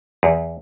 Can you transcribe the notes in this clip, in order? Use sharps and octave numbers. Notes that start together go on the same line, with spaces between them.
E2